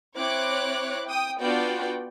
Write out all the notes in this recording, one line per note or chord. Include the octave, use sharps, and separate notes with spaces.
C4 E4 C#5 D6 F#6
G5 D#6
B3 D4 F4 F#4 D5 G5